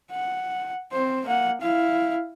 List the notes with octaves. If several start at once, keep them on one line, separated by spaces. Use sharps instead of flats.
F#5
C4 C5
A#3 F#5
E4 F5